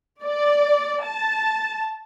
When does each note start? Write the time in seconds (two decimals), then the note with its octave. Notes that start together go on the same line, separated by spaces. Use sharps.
0.24 D5
1.04 A5